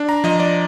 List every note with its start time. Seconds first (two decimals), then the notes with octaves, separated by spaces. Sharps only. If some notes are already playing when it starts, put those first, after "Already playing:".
Already playing: D4
0.09 A#5
0.24 F3 D#5
0.40 D5